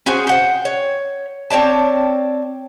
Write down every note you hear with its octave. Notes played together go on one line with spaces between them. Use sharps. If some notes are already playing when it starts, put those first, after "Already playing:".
C#4 F#4 G#4 C5
C5 F#5 G5
C#5
C4 C#5 D5 A5